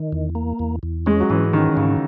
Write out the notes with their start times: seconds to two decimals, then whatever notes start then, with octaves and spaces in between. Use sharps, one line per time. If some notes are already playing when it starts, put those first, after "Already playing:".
Already playing: D#3
0.12 E2
0.35 A#3
0.59 E2
0.83 E2
1.06 G#3 C#4
1.20 F#3
1.30 G#2 E3
1.53 D#3 C#4
1.77 G#2 C#3